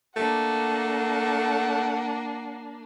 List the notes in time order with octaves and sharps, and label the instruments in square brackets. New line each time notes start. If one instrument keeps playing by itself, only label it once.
[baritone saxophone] A3 [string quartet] A#3 D4 [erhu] F#5